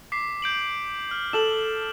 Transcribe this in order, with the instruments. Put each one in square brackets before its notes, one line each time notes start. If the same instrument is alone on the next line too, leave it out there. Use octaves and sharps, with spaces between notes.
[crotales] D6 B6 C7
G6 D7 F#7
F6
[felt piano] A4 [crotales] E7 F#7